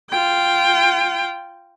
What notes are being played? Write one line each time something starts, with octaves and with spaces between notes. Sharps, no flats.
F4 G5